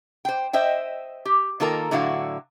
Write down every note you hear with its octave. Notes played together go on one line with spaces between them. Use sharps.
C5 G5
C5 D#5 E5 G5
G4
D#3 A#3 F4 A4 A#4 A#5
A2 D3 F#3 E4 F#4 F5